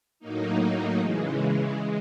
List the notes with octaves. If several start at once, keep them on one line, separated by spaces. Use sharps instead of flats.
A2 F#3 A#3 D#4
C#3 E3 G#3
G#3